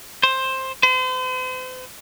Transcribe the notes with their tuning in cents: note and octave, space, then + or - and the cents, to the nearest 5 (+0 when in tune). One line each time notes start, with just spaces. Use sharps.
C5 +10
C5 -40